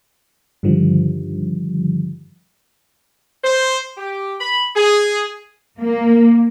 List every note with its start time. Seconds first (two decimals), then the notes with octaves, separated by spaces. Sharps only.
0.63 G2 D3 D#3 F3 G3
3.44 C5
3.97 G4
4.39 B5
4.76 G#4
5.80 A#3